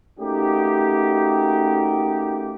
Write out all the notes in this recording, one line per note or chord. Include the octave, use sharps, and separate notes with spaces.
A3 A#3 C#4 D#4 F#4 G4